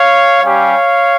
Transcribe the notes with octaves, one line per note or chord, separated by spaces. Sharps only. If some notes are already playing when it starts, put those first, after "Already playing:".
Already playing: C#5 F5
G3 C#4 G4 C#5 F5